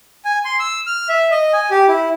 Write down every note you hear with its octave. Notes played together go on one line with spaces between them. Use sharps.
G#5
C6
E6
F6
E5
D#5
G#5
G4
E4